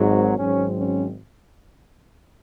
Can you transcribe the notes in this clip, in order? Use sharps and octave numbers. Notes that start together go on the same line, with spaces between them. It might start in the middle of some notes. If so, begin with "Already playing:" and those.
Already playing: G#1 G#2 F#3
G#1 G#2 F#3 C4 C#4
C#4